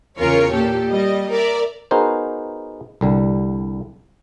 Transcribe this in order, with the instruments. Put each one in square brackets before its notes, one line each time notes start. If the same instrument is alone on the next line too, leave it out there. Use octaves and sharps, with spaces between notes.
[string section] E2 C#3 C#4 F4 A#4 C#5
A#2 G4 A4
G3 D#5
A#4 D5 E5
[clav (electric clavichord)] B3 D#4 F#4 G#4 A#4 C5
C2 D3 G3